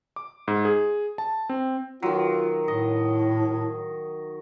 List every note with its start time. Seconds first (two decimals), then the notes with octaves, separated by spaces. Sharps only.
0.16 D6
0.48 G#2
0.65 G#4
1.18 A5
1.49 C4
2.02 D#3 F#3 F4
2.68 A2 D#5